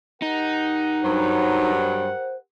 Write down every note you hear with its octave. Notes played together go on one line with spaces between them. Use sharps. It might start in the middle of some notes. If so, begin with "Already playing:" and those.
D#4 G4 A#4 F#5
G2 F#3 C5